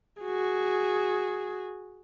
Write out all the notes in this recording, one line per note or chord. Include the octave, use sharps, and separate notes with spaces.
F#4 G#4